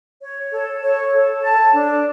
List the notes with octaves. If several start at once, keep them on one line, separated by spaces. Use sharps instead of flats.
C#5
A4
C#5
A4
A5
D4